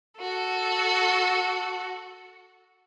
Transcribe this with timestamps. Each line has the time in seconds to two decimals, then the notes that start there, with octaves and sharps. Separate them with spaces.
0.21 F#4 A4